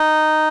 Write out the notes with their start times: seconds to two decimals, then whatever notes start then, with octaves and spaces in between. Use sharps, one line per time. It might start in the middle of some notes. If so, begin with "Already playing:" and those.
Already playing: D#4